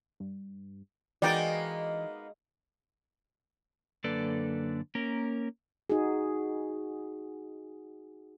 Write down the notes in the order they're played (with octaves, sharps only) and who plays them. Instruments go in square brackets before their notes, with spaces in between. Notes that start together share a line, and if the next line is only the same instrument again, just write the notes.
[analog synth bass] G2
[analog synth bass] E3 [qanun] G#3 F#4 [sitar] A#3 B3 D#4 [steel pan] D5 G5
[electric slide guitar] F#2 D3 A#3 A4 B4 D5
A#3 C#4 A#4
[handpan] D#4 F#4 G#4